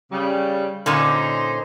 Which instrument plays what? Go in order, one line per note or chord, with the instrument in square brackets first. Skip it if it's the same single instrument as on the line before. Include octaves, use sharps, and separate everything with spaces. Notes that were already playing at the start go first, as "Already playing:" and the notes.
[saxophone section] C#3 G3
[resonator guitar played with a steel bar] A#2 D3 C#4 [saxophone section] D#4 C5